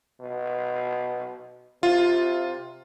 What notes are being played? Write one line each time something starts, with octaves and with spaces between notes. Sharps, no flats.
B2
C3 F4